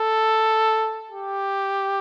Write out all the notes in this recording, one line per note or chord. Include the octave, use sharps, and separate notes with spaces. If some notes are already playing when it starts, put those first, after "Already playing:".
Already playing: A4
G4